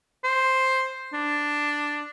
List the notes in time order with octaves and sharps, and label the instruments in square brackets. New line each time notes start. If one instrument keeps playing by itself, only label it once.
[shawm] C5
D4